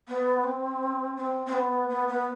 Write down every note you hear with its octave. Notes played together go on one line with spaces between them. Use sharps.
B3
C4
C4
C4
B3
B3
B3